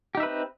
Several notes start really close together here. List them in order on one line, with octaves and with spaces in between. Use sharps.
G4 D#4 E5 B4 C4